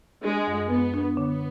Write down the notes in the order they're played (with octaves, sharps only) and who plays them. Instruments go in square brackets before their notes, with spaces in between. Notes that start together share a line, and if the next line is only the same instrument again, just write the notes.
[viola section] G#3 [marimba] D4
[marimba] F#2
[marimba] F#2 [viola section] B3
[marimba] D4
[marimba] D3 [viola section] B3